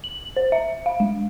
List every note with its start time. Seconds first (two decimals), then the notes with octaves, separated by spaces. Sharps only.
0.04 F#7
0.37 C5
0.52 E5
0.86 F5
1.00 G#3